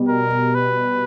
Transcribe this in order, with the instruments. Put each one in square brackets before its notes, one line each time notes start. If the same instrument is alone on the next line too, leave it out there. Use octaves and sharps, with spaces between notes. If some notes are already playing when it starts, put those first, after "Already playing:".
Already playing: [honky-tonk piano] B2 G3
[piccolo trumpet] A#4
B4